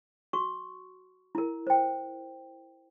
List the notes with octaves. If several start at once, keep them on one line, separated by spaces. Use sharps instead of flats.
F#4 C#6
E4 A#4
C5 G5